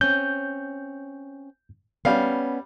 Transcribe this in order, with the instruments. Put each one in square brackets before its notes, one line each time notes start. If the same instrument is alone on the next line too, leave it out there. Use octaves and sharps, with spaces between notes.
[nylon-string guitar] C4 C#4 [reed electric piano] G6
[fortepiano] G3 F5 [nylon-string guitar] B3 C#4